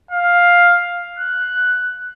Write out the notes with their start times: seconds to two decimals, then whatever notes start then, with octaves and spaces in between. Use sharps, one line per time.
0.11 F5
1.19 F#6